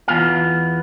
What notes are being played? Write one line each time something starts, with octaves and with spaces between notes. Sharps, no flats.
E2 B3 F4 F5